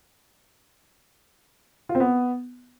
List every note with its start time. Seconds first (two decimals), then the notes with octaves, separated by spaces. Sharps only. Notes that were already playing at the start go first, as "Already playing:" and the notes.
1.89 F4
1.95 C4
2.00 B3